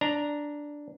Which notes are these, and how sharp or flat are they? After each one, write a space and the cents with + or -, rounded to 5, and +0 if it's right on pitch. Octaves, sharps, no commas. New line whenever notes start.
D4 +0 A#5 +0